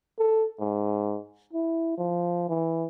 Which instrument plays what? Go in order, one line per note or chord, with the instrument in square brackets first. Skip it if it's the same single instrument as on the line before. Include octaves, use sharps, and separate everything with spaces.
[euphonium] A4
G#2
E4
F3
E3